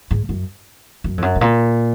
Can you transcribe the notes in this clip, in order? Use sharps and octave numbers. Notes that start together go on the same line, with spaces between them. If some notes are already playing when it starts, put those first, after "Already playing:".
G#2
F#2
F#2
F2
F#2
G#2
A#2